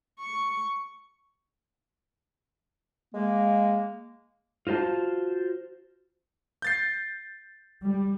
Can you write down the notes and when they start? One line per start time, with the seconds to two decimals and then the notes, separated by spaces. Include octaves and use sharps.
0.20 C#6
3.14 G#3 A#3
4.67 F4 F#4 C5 F5 A5
6.62 G6 A6 C7
7.82 G3